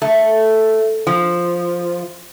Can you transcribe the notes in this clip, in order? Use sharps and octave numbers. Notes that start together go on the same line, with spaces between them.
A3
F3